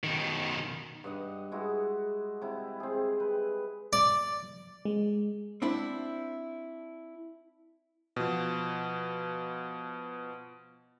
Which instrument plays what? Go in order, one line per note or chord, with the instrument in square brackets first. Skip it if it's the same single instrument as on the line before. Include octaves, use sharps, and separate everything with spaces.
[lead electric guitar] B2 D#3
[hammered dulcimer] G2 D#5 F#5
G#3 E4 F#4
C3 E4
C4 G#4
B4
[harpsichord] D5
[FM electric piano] G#3
[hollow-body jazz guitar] C4 D4 E4
[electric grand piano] B2 F3